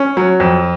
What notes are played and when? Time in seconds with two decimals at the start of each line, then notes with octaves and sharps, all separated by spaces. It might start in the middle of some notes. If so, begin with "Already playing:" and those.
Already playing: C#4
0.17 F#3
0.40 F2